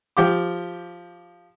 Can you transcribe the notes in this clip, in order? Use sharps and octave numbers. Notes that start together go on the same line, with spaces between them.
F3 G4 D6